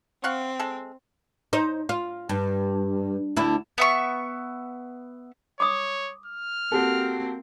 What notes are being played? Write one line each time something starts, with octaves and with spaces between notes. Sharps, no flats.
C4 F5 F#5 C#6
G#3 A4
D#4 C5
F4
G2
D2 D3 E4
B3 E5 C#6
C#5 D6 D#6
F6
A#3 C4 F#4 G4 A4